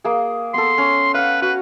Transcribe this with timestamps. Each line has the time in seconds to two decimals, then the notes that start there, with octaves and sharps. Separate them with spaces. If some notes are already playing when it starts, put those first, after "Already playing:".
0.04 A#3 G#4
0.54 B3 A4 C6
0.78 C#4
1.14 B4 F5 F#5
1.42 F#4 B4